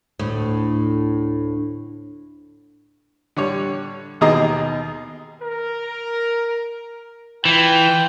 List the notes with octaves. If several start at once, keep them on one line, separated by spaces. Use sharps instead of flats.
D2 A2
D3 G3 C#5
D#2 B2 D#3 G#4 D#5 A#5
A#4
E3 F4 G5